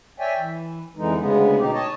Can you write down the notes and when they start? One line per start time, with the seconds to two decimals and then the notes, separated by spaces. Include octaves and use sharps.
0.20 C#5 D5 E5 G5 G#5
0.38 E3
0.97 F2 D3 E3 G#3 D#4
1.17 D2 C#3 G#3 B3
1.58 B2 D#4 G4
1.73 C#5 D#5 A5